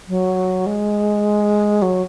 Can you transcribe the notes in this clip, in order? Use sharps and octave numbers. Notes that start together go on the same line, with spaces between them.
F#3
G#3
F#3